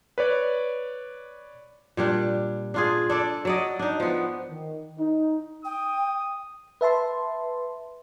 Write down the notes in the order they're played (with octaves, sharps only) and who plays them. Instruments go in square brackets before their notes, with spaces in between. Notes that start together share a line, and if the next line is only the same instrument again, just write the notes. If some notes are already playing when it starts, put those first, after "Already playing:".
[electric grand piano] B4 C#5 D5
[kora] A#2 G3 D4
D4 F4 G#4
D4 A4 D5
F#3 D5 D#5
D4 D#4
F3 B3
[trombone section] D#3
D#4
[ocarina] G5 [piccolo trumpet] D#6
[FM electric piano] B4 E5 A5 C6